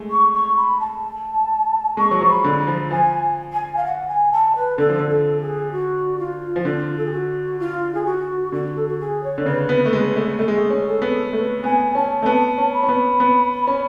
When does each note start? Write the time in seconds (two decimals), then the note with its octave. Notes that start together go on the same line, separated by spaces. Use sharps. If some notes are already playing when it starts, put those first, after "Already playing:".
Already playing: G#3 A3
0.10 C#6
0.33 C#6
0.56 B5
0.80 A5
1.97 G#3 C#6
2.11 F#3
2.21 F3
2.29 B5
2.44 D3
2.59 B5
2.67 F3
2.91 F3 G#5
3.53 G#5
3.76 F5
3.84 F#5
4.08 G#5
4.32 A5
4.55 B4
4.78 D3 A4
4.89 F3
4.99 D3
5.09 A4
5.40 G#4
5.72 F#4
6.18 F4
6.56 F3
6.64 D3 F4
6.97 A4
7.05 G#4
7.11 F#4
7.59 F4
7.94 G#4
8.05 F#4
8.52 D3 F#4
8.75 A4
8.88 F#4
9.00 G#4
9.23 C#5
9.38 D3
9.45 C#3 B4
9.69 B3
9.86 A3
9.93 G#3
10.16 A3
10.39 A3 G#4
10.48 G#3
10.57 A3
10.70 C#4
10.87 A4
11.02 B3
11.33 A3 B4
11.64 B3 G#5
11.95 C#4 A5
12.23 A3
12.26 B3 A5
12.58 C#4
12.73 B5
12.83 C#4
12.89 B3
13.20 B3
13.67 C#4